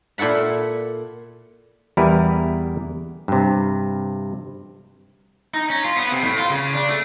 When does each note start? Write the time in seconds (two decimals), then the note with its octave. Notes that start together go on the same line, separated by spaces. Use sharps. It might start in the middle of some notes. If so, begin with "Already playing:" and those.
0.18 A#2 E4 A4 F#5 B5
1.97 E2 G3 E4 A#4 B4 G#5
3.28 G2 C3
5.54 D#4
5.70 C#4
5.84 F4
5.96 B3
6.12 C3
6.24 A2
6.38 F4
6.50 C#3
6.73 D4
6.88 A3